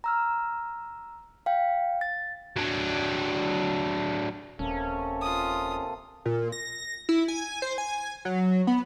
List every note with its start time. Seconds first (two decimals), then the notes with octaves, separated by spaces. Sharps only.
0.04 A#5 E6 F6
1.46 F5 G5
2.01 A6
2.56 F#3 D4
4.59 D#1 C3 A#3 C#4 A4
5.21 F4 D#6
6.25 A#2
6.52 A#6
7.09 E4
7.28 G#5
7.62 C5
7.78 G#5
8.25 F#3
8.67 B3